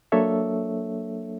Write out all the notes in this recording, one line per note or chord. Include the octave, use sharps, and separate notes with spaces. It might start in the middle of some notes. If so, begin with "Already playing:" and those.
F#3 A#3 D4 A4 C#5 E5